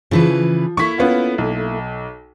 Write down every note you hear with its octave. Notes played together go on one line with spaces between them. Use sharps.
C#3 E3 F3 B4
A#3 E4 A4 C#6 B6
B3 C#4 F4
B1